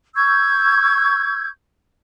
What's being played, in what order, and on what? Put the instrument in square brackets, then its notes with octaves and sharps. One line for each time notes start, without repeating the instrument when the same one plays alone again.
[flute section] C#6 E6 G6 G#6